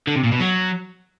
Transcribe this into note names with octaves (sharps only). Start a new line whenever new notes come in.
D3
C3
A#2
B2
F#3